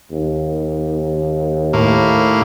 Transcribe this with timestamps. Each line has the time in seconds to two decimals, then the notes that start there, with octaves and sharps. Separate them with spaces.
0.11 D#2
1.73 A2 A#3